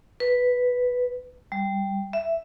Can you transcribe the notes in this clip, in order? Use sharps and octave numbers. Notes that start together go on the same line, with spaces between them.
B4
G3
E5